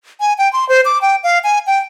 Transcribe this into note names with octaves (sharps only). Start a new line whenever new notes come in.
G#5
G5
C6
C5
D6
G5
F5
G#5
G5